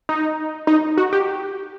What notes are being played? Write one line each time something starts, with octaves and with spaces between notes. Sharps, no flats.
D#4
D#4
F#4
G4